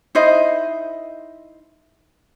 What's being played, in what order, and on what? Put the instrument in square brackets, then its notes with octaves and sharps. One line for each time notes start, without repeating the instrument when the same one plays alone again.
[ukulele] D#4 E4 C5 D#5